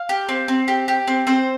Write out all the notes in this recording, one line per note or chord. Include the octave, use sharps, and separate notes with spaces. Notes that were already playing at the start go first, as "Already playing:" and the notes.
Already playing: F5
G4
C4
C4
G4
G4
C4
C4 C5